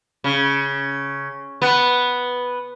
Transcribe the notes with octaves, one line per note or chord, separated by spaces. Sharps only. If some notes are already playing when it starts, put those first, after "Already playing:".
C#3
B3